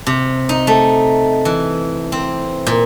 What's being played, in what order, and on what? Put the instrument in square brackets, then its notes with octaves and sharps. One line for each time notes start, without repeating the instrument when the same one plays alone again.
[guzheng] C3
D#4
A3
E3
C4
A#2